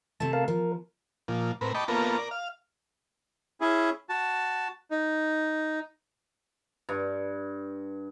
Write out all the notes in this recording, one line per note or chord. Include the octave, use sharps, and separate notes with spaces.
C3 A3 A5
A#4 F5 A5
F3 A#4
A#2 F3
A2 C4 A#4 B4
D#5 G5 A5 B5 C#6 D6
A#3 B3 C#4 F4 A4 A#4
A#4 D5
F5
C#4 E4 G#4
F#4 A5
D#4
G2